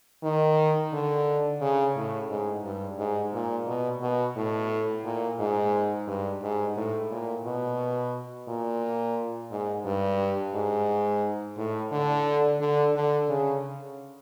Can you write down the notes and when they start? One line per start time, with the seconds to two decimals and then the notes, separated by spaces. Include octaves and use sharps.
0.23 D#3
0.93 D3
1.61 C#3
1.96 A2
2.30 G#2
2.64 G2
2.98 G#2
3.33 A#2
3.67 B2
4.02 B2
4.36 A2
5.05 A#2
5.39 G#2
6.08 G2
6.42 G#2
6.77 A2
7.11 A#2
7.45 B2
8.48 A#2
9.51 G#2
9.86 G2
10.54 G#2
11.57 A2
11.92 D3
12.60 D3
12.95 D3
13.29 C#3